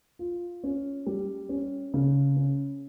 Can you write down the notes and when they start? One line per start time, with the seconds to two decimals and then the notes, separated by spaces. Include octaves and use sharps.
0.19 F4
0.63 C#4
1.06 G3
1.49 C#4
1.94 C#3
2.36 C#4